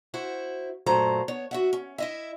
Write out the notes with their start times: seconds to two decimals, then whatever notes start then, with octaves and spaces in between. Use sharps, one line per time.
0.14 E4 F#4 C5
0.86 F#2 A#2 F#3 A3 C5 A#5
1.28 B3 C#5
1.51 F#4 E5 F#5
1.73 C#4
1.98 E4 D#5 E5